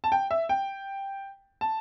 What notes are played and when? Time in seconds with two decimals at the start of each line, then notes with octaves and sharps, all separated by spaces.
0.04 A5
0.12 G5
0.31 E5
0.49 G5
1.61 A5